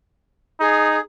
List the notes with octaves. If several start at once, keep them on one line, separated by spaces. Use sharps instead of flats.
D#4 G#4